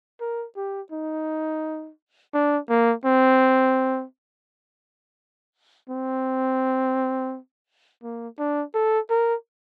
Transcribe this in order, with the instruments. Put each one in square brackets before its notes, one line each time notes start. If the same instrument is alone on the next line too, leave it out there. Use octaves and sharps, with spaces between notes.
[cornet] A#4
G4
D#4
D4
A#3
C4
C4
A#3
D4
A4
A#4